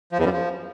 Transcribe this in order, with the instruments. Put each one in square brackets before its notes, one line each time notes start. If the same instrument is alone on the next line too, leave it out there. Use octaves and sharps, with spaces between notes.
[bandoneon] F3
E2
F#2
F3